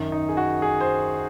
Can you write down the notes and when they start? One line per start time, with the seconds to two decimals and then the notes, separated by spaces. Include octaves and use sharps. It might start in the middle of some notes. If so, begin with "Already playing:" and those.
Already playing: F#2 D#3
0.12 D#4
0.29 G#4
0.37 F#4
0.62 G#4
0.81 C5